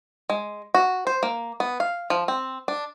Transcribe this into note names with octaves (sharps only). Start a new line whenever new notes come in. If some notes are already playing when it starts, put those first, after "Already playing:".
G#3
F#4
C5
A#3
B3
F5
F3
C4
D4